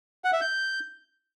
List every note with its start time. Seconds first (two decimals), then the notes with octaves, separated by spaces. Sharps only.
0.24 F#5
0.33 E5
0.41 G6